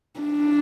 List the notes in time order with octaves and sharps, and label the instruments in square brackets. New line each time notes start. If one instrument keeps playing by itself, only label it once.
[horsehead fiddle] D4